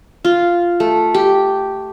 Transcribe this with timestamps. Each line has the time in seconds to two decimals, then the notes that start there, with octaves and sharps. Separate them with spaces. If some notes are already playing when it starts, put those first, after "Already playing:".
0.25 F4
0.80 A3
1.14 G4